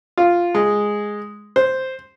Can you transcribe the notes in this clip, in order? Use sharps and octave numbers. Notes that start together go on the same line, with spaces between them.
F4
G#3
C5